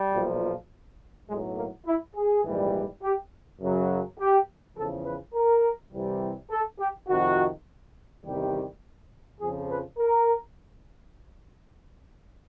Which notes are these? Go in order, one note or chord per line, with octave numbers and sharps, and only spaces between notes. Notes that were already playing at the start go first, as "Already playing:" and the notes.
Already playing: G3
B1 A#2 F3
B1 A2 F#3 G#3
A#3
E4
G#4
A#1 G#2 E3 G3
G4
F#2 C#3 F#3
G4
E2 C#3 F3 A4
B4
A#4
C2 C3 E3 G3
A4
G4
F2 C3 D#3 F#4
E2 C3 D#3 G3 G4
F2 C#3 F3 G#4
B4
A#4